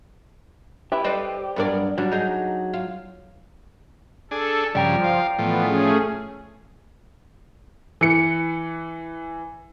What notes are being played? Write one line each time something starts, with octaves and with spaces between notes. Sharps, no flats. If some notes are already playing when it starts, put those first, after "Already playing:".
E4 G4 B4 E5
A4 B4 C5 D5 D#5
G2 F#3 B3 A#4 D5
F#3 G3 D4 F#4
D#4 G#4
F4
D4 G#4 A4
G2 C#3 F3 D5 G5 A#5
F4
A2 E3 F3 B3
A3 C#4 G#4
E3 C#7